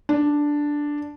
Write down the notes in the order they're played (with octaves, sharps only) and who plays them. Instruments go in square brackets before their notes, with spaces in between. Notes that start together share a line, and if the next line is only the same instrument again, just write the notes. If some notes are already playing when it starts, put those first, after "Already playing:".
[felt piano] D4